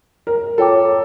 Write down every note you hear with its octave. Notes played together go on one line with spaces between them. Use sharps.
A#4
F4 A4 C#5 G5 D6